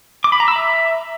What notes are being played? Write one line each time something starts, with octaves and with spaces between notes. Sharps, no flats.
D6
B5
A#5
E6
E5